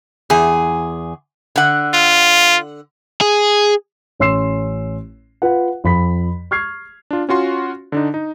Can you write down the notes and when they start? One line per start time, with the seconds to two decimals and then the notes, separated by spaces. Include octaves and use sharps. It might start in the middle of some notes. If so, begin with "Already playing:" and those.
0.30 E2 G#4
1.56 D3 F#5
1.94 F4
3.21 G#4
4.19 A1 C#4 C6 E6 C7 E7
5.42 F4 B4 F#5
5.84 F2 B5 B6
6.51 C#6 F6 G#6 C7
7.11 D4 F4
7.29 C#4 F4 F#4 C6
7.92 D3 D4 D#4
8.14 D#4